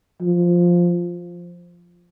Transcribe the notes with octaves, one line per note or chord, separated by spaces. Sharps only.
F3